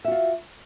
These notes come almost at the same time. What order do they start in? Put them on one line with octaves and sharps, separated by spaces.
E5 F#4 F4